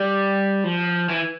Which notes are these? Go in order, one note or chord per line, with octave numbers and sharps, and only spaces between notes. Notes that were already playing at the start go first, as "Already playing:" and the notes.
Already playing: G3
F3
E3